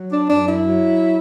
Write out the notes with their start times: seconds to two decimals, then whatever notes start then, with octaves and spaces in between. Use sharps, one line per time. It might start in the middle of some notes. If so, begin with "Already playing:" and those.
Already playing: F#3
0.11 D4
0.29 F#2 D4
0.48 E4
0.67 F#3